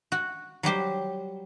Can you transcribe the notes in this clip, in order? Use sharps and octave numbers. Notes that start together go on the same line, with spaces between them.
F#4
F#3 G3 G4 C5